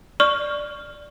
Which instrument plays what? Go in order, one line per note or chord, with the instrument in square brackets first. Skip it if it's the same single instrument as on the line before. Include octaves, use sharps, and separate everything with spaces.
[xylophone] D5 C#6 F6